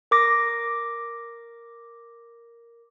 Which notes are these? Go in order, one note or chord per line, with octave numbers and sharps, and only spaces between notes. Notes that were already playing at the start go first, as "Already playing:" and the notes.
A#4 D6 A#6